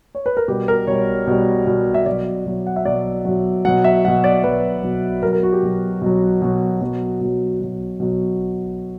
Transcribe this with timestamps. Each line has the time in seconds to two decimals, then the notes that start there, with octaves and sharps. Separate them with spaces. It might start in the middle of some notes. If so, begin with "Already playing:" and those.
0.15 C#5
0.26 B4
0.37 A#4
0.48 B2 G3 G4
0.68 A#4
0.87 B2 G3 C#5
1.27 B2 G3
1.67 B2 G3
1.94 E5
2.06 B2 F#3 D5
2.46 B2 F#3
2.67 F#5
2.76 E5
2.85 B2 F#3 D5
3.25 B2 F#3
3.65 B2 F#3 F#5
3.84 E5
4.05 B2 F#3 F#5
4.24 D5
4.44 B2 F#3 B4
4.83 B2 F#3
5.22 B2 A#4
5.25 F#3
5.33 A#4
5.43 F#4
5.53 G4
5.63 B2 F#3
6.02 B2 F#3
6.42 B2 F#3
6.81 B2 F#3
7.21 B2 F#3
7.60 B2 F#3
8.00 B2 F#3